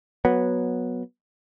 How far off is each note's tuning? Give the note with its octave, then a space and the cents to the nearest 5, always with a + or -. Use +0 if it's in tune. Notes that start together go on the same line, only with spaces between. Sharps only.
F#3 -10 B3 -10